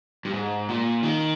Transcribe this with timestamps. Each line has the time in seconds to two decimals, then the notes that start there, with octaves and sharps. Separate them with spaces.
0.25 G2
0.34 G#2
0.69 A#2
1.03 D#3